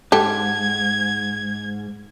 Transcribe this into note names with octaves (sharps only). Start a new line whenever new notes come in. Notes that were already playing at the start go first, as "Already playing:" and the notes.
G#2 G4 A4 G#6